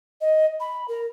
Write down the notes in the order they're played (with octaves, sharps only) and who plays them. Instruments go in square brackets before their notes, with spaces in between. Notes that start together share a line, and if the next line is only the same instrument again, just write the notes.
[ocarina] D#5
B5
A#4